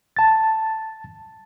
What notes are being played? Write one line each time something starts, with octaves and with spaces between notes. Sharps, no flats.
A5 A6